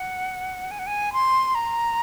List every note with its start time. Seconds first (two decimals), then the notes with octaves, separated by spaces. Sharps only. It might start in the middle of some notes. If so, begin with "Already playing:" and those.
Already playing: F#5
0.71 G#5
0.79 F#5
0.87 G#5
1.13 C6
1.55 A#5